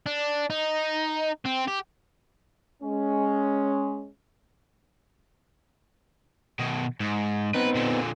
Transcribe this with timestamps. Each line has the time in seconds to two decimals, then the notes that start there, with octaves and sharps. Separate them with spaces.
0.06 D4
0.50 D#4
1.46 C4
1.68 G4
2.82 G#3 C#4
6.59 B2 D#3
7.00 G#2
7.54 B3 C4 D#4 B4
7.75 A#2 D3